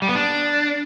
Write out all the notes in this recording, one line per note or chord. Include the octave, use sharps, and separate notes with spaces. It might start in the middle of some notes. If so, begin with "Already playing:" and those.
G3
B3
D4